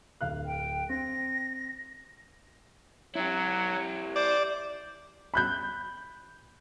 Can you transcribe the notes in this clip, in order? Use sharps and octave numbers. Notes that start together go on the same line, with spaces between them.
D1 F5 F#6
G5
C4 A#6
F#3 E4 G4
C5 D5
B5 F#6 G6